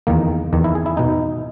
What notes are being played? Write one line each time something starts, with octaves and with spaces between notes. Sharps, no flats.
E2 D#3 A#3
E2 D#3
E4
G#4
E4
B2 D#4